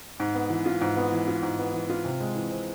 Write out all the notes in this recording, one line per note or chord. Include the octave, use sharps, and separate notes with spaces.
G#2
B3
E3
F4
G#2
B3
E3
F4
G#2
B3
E3
F4
C3
G#3
E3
C4